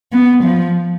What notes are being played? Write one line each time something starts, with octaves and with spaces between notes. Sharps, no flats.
B3
F3